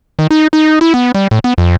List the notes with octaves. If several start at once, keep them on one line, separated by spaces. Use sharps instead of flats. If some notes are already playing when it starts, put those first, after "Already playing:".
D#3
D#4
D#4
E4
B3
G3
A2
B3
F2